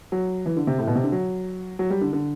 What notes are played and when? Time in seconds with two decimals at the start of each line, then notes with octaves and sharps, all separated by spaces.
0.12 F#3
0.46 E3
0.56 D3
0.67 C3
0.79 A2
0.87 B2
0.95 C3
1.04 D3
1.12 F#3
1.79 F#3
1.90 G3
2.01 D3
2.13 D3